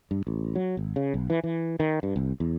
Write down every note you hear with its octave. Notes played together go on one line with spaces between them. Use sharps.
G2
A1
F#3
G#1
C#3
B1
E3
E3
D#3
G2
C2
E2